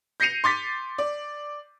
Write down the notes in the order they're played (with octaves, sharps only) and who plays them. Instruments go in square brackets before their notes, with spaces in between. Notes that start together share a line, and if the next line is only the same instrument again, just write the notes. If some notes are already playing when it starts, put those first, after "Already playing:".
[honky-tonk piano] G6 A#6 C7 C#7 D#7 F7
C6 D6 A6 B6
D5